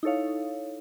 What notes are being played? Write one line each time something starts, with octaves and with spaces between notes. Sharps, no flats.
D#4 E4 A4 C#5 F5